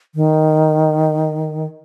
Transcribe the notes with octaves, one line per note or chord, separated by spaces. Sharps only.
D#3